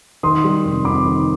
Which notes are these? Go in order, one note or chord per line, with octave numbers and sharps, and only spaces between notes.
D#3 C6 D#6
G3
F1
F2 B5 D6
D#3